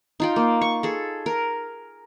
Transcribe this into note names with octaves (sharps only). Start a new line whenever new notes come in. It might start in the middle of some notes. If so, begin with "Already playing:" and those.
D#4 F4 G5
A#3
C#6
G#4 A4
A#4